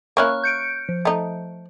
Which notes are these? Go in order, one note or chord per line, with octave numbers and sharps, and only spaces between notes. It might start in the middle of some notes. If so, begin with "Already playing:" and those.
A#3 C#4 E4 C#6 F6 F#6
G6 C#7 D7
F3
A3 D#4